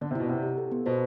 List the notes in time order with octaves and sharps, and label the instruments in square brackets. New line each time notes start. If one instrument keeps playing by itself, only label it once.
[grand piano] D3 [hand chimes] D5
[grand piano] C3
[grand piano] B2 [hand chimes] E4
[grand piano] C3 [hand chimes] F#5
[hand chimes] G4
A4
B3
[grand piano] B2 [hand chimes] C5